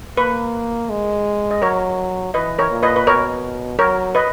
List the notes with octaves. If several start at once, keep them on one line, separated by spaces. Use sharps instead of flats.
A#3 B4
G#3
D#5
F#3 A#4 C#5
E3 B4 D#5
A#4 C#5
A#2
B4 D#5
B4
B2 A#4 C#5
F#3 A#4 C#5
B4 D#5